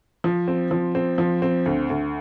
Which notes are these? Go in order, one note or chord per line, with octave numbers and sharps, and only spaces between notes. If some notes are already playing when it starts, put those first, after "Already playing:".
F3
C4
F3
C4
F3
C4
D2
D2